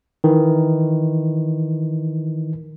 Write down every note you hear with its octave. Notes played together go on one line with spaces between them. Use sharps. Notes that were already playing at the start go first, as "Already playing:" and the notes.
D#3 E3